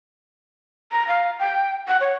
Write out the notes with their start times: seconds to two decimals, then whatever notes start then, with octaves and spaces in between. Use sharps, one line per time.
0.92 A#5
1.08 F5
1.39 G5
1.88 F#5
2.01 C#5